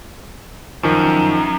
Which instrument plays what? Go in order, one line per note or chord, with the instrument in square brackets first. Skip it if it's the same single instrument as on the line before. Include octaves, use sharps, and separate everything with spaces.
[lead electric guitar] F#2 [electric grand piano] D#3 F3